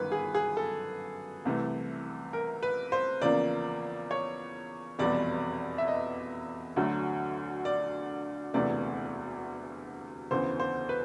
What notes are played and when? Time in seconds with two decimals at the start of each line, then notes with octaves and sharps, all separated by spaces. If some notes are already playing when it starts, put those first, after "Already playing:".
Already playing: G1 F#2 D#3 B4
0.12 G#4
0.35 G#4
0.57 A4
1.45 C2 C3 E3 A3
2.33 A#4
2.63 B4
2.92 C5
3.22 E2 C#3 F3 A#3 D5
4.11 C#5
4.99 F1 E2 B2 G3 D5
5.78 E5
5.88 D#5
6.76 D2 D3 F#3 A3
7.65 D5
8.54 E1 D2 C3 E3 A3 D5
10.31 E1 D2 C#3 E3 C5
10.60 C5
10.89 B4